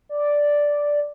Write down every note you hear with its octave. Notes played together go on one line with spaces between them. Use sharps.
D5